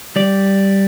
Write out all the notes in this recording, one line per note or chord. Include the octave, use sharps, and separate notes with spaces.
G3 D5